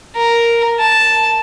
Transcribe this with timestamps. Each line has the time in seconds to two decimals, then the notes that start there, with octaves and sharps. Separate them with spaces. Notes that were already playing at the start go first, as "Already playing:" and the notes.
0.16 A#4
0.79 A5